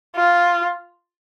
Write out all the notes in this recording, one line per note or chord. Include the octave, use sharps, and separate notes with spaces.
F4